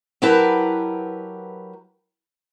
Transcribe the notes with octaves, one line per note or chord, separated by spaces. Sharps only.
F#3 E4 G4 A#4 B4 A5